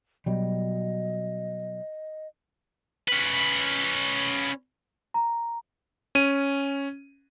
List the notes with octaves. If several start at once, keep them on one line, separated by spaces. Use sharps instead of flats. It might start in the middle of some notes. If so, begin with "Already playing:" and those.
B2 F#3 G3 D#5
C#4 B4
A#5
C#4 D#7